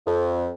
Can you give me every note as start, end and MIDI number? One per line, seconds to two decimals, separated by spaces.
0.07 0.51 41